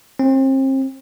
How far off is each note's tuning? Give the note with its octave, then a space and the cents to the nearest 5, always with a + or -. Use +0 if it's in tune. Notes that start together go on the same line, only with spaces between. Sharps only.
C4 +35